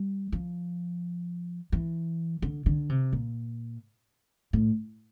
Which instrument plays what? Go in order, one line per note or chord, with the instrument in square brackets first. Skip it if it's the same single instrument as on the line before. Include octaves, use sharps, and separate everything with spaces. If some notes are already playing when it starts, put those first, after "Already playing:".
Already playing: [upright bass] G3
F3
E3
D3
D3
C3
A#2
A2